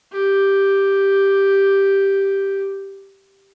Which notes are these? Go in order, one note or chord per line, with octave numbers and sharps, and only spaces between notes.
G4